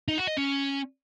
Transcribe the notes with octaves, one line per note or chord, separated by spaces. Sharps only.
D#4
F#4
D#5
C#4